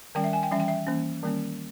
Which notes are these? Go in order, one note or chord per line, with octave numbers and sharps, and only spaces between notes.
D#3 G3 C#4 G5
E5
G#5
G5
E3 G3 C#4 E5
G5
E5
E3 A#3 C#4
D#3 G3 A#3 C#4